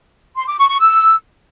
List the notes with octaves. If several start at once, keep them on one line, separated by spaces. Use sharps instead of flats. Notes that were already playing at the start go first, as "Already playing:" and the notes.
C6
D6
C#6
C#6
E6